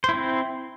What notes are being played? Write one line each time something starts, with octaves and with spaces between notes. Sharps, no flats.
C4 E4 C5